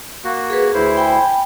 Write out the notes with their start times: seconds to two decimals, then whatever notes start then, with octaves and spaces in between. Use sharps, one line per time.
0.25 A#3 F#4
0.50 G#4 B4
0.74 D2 E4 C5
0.97 G5 G#5 B5